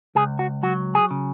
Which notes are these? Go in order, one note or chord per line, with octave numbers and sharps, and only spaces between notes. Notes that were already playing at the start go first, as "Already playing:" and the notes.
C#2 G#4
F#4
F#3 F#4
G#4
C#3